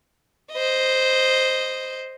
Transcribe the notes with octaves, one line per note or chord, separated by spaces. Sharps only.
C5 D#5